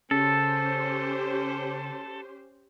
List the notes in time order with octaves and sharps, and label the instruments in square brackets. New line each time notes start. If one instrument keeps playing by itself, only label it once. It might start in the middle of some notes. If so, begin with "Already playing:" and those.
[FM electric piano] C#3 [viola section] C#4 G4 C5 [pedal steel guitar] A4